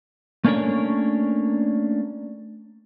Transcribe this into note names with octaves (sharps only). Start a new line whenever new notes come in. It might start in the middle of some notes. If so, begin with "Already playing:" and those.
A3 A#3 C#4 D4 A#4 C#5